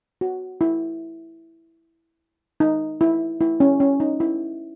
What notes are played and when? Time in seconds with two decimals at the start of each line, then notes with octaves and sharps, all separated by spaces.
0.21 F#4
0.61 E4
2.60 D#4
3.01 E4
3.41 E4
3.60 C#4
3.80 C#4
4.00 D#4
4.20 E4